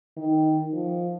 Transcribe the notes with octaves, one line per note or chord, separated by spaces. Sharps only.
D#3
F3